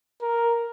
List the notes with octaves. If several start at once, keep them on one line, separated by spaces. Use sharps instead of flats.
A#4